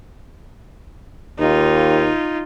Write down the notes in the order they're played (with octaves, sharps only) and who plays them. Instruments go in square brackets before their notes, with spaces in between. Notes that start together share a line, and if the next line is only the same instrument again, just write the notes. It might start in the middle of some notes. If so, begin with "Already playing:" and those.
[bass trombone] D#2 [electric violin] D#4 F4